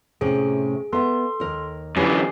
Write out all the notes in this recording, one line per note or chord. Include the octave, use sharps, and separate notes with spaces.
A2 C3 C#4 G#4
B3 A4 E5 C6
D#2 A#4
F#2 D3 E3 C#4 G4 B4 G#5 C7